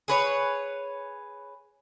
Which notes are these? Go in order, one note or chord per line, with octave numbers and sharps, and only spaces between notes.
G#4 B4 C#5